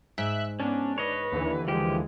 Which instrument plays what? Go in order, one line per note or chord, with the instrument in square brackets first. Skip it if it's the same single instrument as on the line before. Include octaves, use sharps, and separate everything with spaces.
[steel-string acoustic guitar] G#2 [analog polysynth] E5 F#6
[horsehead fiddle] B3 [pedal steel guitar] C#4 [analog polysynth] D4
[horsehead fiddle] B4 [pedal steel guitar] C#5 D#5
[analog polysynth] D#2 D3 E3
[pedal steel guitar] F3 G4 [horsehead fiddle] G#3